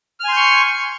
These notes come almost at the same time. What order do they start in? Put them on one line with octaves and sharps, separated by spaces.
F6 G#5 C6 G6 C#6